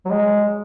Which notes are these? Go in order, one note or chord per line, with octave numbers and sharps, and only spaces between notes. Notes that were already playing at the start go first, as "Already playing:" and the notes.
F#3
G#3